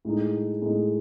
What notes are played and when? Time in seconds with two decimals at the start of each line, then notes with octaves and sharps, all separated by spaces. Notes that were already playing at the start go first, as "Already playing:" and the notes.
0.05 A2 G#3 D#4
0.62 A2 G#3 D#4